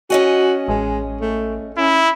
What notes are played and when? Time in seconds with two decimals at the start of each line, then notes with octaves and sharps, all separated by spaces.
0.10 C#4 F#4 D#5 G#5
0.68 A1 G#3
1.21 A3
1.78 C#4 E4